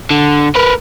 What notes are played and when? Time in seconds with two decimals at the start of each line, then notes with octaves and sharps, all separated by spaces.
0.11 D3
0.56 A#4 B4